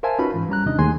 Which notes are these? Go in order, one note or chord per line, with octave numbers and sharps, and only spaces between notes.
A#4 C5 E5 F5 G#5 A5
C#4 D#4 F4 F#4 B4 B5
G#2 E3
G3 C#4 A#5 F#6
D#2 C3 D4 D#4 D#5
D#2 A3 G#4 G#5 C6